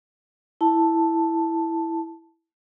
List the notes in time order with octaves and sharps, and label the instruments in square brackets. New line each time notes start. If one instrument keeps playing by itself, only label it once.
[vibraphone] E4 A5